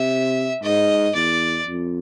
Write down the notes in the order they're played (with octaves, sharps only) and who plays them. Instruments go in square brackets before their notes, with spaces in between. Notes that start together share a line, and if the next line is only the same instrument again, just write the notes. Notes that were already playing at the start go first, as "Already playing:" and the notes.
Already playing: [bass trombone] C3 [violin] E5
[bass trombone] G#2 [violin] D#5
[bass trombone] E2 [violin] D5
[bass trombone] F2